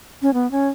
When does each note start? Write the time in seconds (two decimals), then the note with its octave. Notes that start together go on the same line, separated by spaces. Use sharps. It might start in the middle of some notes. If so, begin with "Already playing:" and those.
0.22 C#4
0.34 B3
0.51 C#4